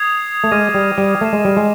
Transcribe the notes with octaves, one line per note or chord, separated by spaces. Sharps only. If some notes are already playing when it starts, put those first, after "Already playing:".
Already playing: D#6 G#6 C7 F7
A3
G#3 D6 F6 A#6 D#7
G3
G3
A3 D#6 G#6 C7 E7
G#3
G3
G#3